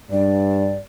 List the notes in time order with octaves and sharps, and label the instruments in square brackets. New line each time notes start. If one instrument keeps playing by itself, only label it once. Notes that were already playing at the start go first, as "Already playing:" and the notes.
[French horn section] G2 [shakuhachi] D5